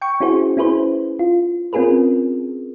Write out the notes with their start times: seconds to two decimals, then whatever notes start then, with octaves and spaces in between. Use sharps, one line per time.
0.02 G5 C#6
0.20 C#4 E4 F#4 G#4 C5
0.57 C#4 E4 G#4 B4 C5
1.19 F4
1.73 C4 C#4 F4 G#4 A#4 B4